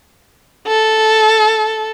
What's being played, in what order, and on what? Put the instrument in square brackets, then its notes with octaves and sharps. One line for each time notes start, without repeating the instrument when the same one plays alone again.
[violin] A4